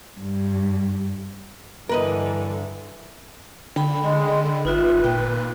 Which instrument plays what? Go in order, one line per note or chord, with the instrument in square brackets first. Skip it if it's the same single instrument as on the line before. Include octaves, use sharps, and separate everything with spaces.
[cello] G2
[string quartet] G2 D3 [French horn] E3 [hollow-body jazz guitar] A#4 B4 D#5
[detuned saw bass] D3 [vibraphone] G5 B5
[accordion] G#3
[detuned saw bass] G#1 [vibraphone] D#4 F4 E5 [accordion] B4
[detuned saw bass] A#2 [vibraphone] G5